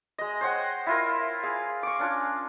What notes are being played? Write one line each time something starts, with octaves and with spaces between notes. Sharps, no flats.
G#3 D#5
C5 C#5 F#5 G5
E4 F4 A#4
G#4 F5
C#6 D6
C#4 D4 F4